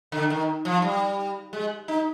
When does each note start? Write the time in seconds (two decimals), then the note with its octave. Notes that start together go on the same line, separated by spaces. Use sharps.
0.12 D3
0.30 D#3
0.65 F3
0.82 G3
1.53 G#3
1.88 D#4